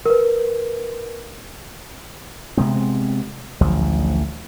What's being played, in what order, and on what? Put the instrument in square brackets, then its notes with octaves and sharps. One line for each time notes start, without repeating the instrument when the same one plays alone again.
[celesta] A#4 B4
[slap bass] C3 G#3 B3 C4
A1 D2 F3 F#3